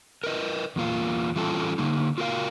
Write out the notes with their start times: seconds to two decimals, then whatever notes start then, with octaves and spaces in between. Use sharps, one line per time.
0.24 A#4 B4 D#5
0.76 E2 A#3 F4
1.36 E3 G3 C#4 F4 A4
1.78 D3 A#3 D#4
2.18 F4 F#4 A#4 D5 F5